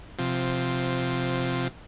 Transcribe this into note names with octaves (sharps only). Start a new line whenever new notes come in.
C3 F3